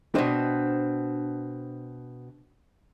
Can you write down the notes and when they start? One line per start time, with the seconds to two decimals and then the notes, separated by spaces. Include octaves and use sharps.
0.15 B2 C4 D4 C5 D#5